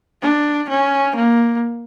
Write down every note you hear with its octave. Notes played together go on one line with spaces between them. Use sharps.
D4
C#4
A#3